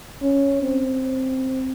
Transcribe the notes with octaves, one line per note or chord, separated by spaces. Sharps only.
C#4
C4